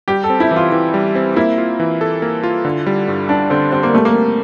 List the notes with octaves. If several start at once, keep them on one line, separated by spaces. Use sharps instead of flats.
G3 G4
A4
C4
E4
E3
F4
E3
G3
C4
A#3 E4
F4
E3
A4
A#3
F4
D3
G3
G2
G2 D4
D3 C4
G3 C4
A#3
G3 A3
A#3
C4